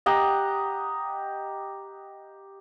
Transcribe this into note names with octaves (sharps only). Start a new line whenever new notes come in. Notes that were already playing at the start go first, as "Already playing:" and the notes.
G4 D#5 F#5 A#5